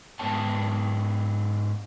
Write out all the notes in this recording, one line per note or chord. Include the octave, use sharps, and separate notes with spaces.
G#2 B3 C#5 G5 A5